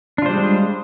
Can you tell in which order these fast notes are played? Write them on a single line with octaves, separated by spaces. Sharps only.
D4 F4 C5 G3 G#3